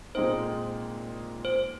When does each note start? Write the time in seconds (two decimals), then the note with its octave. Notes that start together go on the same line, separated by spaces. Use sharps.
0.15 A#2 G#3 C4 D#4 C5
1.45 C5